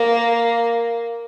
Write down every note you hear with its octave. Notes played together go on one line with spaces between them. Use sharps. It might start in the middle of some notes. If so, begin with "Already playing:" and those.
Already playing: A#3